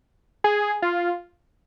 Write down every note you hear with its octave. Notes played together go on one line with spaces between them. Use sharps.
G#4
F4